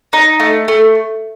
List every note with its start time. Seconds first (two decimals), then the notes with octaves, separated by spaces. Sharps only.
0.13 D#4
0.40 A3
0.68 A3